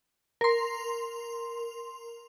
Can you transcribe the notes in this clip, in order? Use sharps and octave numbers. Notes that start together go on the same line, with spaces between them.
A#4 C6